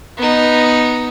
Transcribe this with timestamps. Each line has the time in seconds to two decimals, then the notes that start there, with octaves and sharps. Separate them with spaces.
0.18 B3 D#4